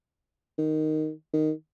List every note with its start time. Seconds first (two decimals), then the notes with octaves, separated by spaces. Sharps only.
0.58 D#3
1.33 D#3